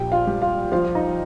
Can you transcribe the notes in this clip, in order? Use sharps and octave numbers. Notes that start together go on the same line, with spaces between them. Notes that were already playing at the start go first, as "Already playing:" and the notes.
Already playing: A#1 G4 G5
F4 F5
G3
F4 F5
F3 F4 F5
D#4 D#5